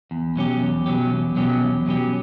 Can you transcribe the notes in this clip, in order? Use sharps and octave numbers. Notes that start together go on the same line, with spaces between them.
E2
B2 F#3 C#4 G4
E2
B2 F#3 C#4 G4
E2
B2 F#3 C#4 G4
E2
B2 F#3 C#4 G4